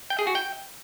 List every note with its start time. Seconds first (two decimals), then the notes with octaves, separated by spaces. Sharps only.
0.10 G5
0.19 G#4
0.27 F#4
0.35 G5